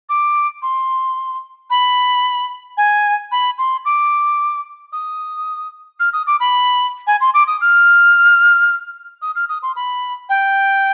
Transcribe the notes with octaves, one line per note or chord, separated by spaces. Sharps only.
D6
C6
B5
G#5
B5
C6
D6
D#6
F6
D#6
D6
B5
G#5
C6
D6
D#6
F6
D#6
F6
D#6
C6
B5
G5